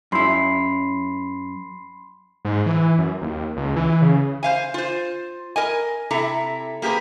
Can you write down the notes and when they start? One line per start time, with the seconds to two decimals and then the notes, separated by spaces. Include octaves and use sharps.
0.12 F#2 E4 B5 C6 C7
2.45 G#2
2.66 E3
2.99 F#2
3.21 D#2
3.57 C#2
3.76 E3
4.02 C#3
4.43 C5 F5 G#5
4.74 F4 C5
5.56 A#4 D#5 G#5
6.10 C3 E4 A4 A#5
6.82 A#3 G4 G#4 A#4 B4